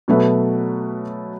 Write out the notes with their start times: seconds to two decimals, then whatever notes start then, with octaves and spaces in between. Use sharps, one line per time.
0.08 B2 F#3 A3 F#4 B4 E5